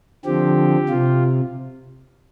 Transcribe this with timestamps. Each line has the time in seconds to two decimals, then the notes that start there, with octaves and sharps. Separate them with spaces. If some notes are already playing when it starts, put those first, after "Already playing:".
0.25 D3 F3 C4 G4
0.89 C3 F4